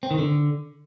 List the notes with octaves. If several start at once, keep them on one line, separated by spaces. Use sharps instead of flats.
C4
D#3
D3